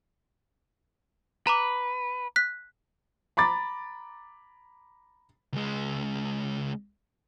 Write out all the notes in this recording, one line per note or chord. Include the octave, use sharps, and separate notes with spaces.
B4 A#5 B5 D6
F#6 B6
A#5 B5 D6 A6
C#2 G#3